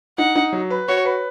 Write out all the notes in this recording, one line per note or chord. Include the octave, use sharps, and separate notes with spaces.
D#4 F#5
D#4
F#3
B4
F#4 C#5
B4